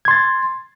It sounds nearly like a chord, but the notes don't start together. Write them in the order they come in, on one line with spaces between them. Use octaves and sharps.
G#6 C6 A6